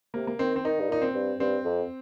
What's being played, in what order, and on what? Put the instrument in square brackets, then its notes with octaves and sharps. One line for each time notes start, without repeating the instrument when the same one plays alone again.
[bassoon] C3 [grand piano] A#3
[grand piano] A#3
[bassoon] D#3 [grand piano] C4
[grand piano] C4
[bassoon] D#3 [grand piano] D#4
[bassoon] G2
[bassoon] A#2 [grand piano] D#4
[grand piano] C4
[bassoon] G2
[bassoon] G2 [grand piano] C4
[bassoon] F2